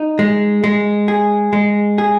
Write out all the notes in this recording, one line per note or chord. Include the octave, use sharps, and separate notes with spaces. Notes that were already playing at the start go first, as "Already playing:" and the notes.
Already playing: D#4
G#3
G#3
G#4
G#3
G#4